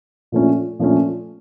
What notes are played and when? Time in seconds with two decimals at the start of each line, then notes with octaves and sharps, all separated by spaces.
0.32 A#2 F3 A3 C#4
0.79 A#2 F3 A3 C#4